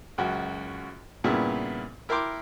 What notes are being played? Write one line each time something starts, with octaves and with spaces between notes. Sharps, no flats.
C#2 F#2 F#4
G2 A#2 C#3 B3 E4
E4 A#4 G5 C6 D6